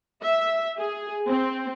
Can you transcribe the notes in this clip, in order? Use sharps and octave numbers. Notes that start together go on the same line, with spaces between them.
E5
G#4
C4